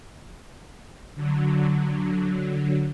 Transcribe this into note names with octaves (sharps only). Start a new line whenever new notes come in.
D3 F#3